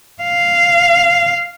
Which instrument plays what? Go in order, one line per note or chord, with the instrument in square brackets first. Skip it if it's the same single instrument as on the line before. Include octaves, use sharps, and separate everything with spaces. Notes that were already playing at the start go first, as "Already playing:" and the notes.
[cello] F5